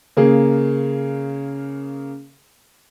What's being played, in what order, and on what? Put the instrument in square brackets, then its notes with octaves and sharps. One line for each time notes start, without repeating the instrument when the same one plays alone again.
[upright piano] C#3 A#3 G#4